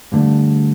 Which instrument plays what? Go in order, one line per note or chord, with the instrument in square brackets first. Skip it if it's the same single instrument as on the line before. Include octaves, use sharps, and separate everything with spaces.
[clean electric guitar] G2 D3 A3